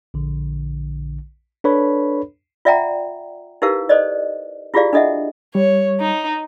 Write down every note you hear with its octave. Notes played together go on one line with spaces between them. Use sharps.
A#1 D3
D4 A4 B4 C#5 B5
F4 D5 E5 F#5 G5 A#5
D#4 E4 G4 A#4 B4 F5
A4 C5 D5 D#5
E4 F4 G4 G#4 D5 F5
D4 A4 D#5 E5 F#5
G3 C#5
D#4